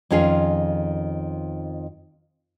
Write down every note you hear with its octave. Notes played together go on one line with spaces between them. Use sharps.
F2 D#3 C#4 F4 G#4